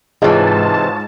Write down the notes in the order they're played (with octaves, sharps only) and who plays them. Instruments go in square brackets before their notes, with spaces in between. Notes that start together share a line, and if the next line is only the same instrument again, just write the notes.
[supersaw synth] G#2 A5 [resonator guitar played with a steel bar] C3 E3 [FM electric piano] G#3 [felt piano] F4 C#5 D#5